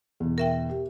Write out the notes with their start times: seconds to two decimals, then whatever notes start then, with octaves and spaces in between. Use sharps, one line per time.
0.20 E2 B2
0.38 A#4 E5 G5
0.69 G4